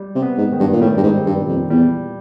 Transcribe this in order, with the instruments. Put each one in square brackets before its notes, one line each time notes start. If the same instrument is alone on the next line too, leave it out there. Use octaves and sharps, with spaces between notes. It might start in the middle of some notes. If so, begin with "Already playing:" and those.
Already playing: [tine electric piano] G3
[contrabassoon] C3
[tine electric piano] B3
[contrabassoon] G#2
[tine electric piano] D#3
[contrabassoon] G2
A#2
[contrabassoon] A2 [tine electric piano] G3
[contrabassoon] G2
G#2
[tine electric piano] C4
[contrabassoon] G2
[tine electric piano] A#2
[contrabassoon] F2
[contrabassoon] E2 [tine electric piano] G3